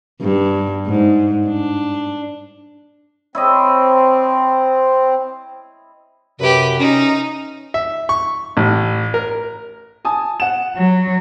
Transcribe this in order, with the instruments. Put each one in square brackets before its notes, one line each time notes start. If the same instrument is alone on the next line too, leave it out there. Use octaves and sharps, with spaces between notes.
[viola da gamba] G2
G#2
D4
[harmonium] C4 [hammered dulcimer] E4 C#5 D#5
[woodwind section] F#2 C3 [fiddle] G4 B4
[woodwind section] C#4 [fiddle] D#4
[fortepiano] E5
C#6
A1
A#4
[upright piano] G#5 A5 D#6
F#5 E7
[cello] F#3